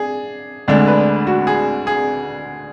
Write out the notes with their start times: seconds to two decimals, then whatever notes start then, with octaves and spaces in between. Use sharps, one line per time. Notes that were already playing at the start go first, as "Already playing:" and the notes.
Already playing: D4 G#4
0.68 D2 D3 G#3 D4 D5
0.87 B4
1.27 F#4
1.47 G#4
1.87 G#4